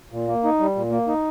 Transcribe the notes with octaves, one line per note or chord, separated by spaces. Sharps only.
A#2
A#3
D#4
G3
A#2
A#3
D#4